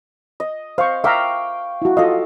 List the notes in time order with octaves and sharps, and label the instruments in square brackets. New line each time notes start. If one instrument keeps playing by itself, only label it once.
[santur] D#5
[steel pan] C5 C#6 [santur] F5
[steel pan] E5 F5 A#5 [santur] G5 C#6 D6
[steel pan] E4 F#4
[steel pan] F4 D#5 [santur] A4 F5